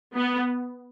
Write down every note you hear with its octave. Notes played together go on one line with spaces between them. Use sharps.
B3